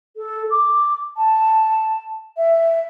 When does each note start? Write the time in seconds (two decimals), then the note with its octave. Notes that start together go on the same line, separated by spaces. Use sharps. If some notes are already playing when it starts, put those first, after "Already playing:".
0.16 A4
0.50 D6
1.17 A5
2.37 E5